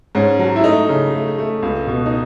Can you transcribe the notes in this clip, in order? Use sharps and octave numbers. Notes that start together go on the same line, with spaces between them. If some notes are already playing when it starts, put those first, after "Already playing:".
G#2 C#4
F#3
E4
A3 D#4
C#3
A3
A3
C#2
B2
D#4